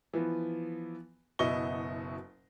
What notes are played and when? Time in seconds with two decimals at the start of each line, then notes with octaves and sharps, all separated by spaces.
0.13 E3 F3 B3
1.39 F#1 B2 E4 D#5 C#6 G7